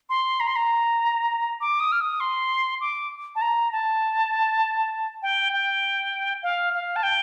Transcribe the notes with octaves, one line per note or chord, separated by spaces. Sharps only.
C6
A#5
C6
A#5
D6
D#6
F6
D#6
C6
D6
A5
A#5
A5
G5
G5
F5
F5
A5
G5